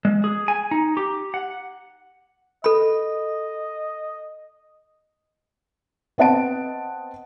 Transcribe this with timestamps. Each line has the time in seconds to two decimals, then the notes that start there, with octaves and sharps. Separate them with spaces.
0.05 G#3
0.24 G#4
0.48 G#5
0.71 D#4
0.97 G4
1.34 F#5
2.64 A4 D#5 B5
6.18 B3 C4 D#5 F#5 A5 D7